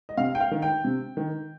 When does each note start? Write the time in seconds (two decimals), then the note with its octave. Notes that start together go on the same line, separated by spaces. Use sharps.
0.09 D#5
0.17 C3 F5
0.35 G5
0.40 F5
0.51 D#3
0.62 G5
0.84 C3
1.17 D#3